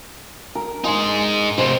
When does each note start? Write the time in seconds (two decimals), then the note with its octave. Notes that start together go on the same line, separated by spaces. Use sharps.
0.55 A#4
0.84 D#4 G#4 C6
1.58 C3 A3 C5